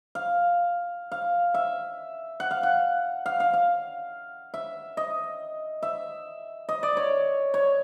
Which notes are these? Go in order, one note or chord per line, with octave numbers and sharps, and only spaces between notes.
F5
F5
E5
F#5
F5
F#5
F5
F5
F5
E5
D#5
E5
D#5
D5
C#5
C#5